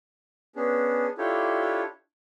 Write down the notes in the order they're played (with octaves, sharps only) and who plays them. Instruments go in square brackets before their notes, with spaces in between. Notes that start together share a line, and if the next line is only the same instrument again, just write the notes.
[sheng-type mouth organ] B3 C#4 D4 G#4
D4 E4 F4 G4 A4 C#5